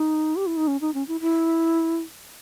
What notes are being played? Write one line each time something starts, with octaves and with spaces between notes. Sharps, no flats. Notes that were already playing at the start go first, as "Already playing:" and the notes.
Already playing: D#4
G4
E4
D#4
C#4
D#4
C#4
E4
E4